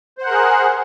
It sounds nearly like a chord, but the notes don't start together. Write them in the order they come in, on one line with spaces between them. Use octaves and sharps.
C5 F#5 A#4 G#4